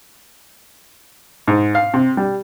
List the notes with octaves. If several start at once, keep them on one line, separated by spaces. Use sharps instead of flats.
G#2
F5
C3
G3